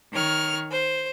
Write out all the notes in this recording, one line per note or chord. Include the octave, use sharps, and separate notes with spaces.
D#3 C#5 F6
C5